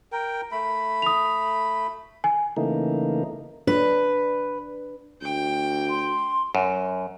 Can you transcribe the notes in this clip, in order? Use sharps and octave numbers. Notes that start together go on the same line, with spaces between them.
A#4 G5
A3 B5
D#6 F7
G#5
C#3 E3 A3 A#3 D#4
D4 B4
D2 G5
C6
F#2